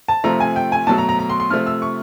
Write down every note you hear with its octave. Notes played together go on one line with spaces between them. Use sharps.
A5
C3 F3 A3 A#5
G#5
G5
G#5
B2 F#3 A3 A5
A#5
A#5
A#5
C6
C6
C3 F3 A3 F6
E6
C#6